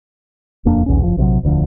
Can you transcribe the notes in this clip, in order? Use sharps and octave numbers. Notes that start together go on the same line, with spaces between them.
D#1 F2 A#3 D4
B1 E2 A#2 C#4
F#1 F3
A#1 C3 E3 F#3
E1 D2 D3 F3